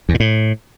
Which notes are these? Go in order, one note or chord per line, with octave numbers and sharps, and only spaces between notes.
E2
A#2
A2